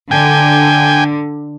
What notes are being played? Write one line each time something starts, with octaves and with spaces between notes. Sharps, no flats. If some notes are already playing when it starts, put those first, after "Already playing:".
D3 G5 G#5